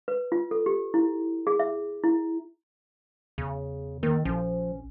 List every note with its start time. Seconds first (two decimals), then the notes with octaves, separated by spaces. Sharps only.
0.08 B4
0.32 F4
0.51 A4
0.66 G4
0.94 E4
1.47 G#4
1.59 E5
2.04 E4
3.38 E2 C#3
4.03 D#3 A#3
4.25 A#1 F3 C#4